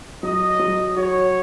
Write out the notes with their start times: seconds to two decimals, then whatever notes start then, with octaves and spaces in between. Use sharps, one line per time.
0.23 F#3 D#5
0.59 F#3
0.96 F#4 C#5